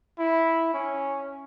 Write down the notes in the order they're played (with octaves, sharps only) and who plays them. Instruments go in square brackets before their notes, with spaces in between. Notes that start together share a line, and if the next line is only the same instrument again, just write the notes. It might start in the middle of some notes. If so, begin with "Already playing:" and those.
[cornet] E4
C#4